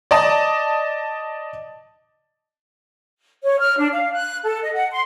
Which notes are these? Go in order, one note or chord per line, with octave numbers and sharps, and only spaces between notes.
D5 D#5 A5
C#5
F6
D4
F5
F#6
A4
D#5
F#5
C6